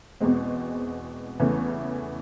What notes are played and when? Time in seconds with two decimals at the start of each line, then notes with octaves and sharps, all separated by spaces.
0.20 E2 B2 G#3 C4
1.40 E2 C#3 E3 A3 C#4